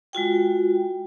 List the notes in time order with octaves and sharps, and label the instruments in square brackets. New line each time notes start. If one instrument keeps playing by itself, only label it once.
[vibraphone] G#3 F4 F#4 G5